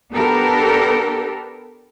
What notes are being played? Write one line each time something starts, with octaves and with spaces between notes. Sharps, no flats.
B3 D4 G4 A4 A#4